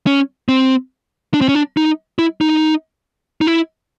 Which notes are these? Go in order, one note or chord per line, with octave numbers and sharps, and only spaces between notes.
C#4
C4
D4
C4
C#4
D4
D#4
E4
D#4
D#4
E4